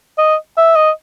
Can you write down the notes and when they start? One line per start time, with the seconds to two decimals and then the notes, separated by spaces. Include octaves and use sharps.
0.18 D#5
0.57 E5
0.76 D#5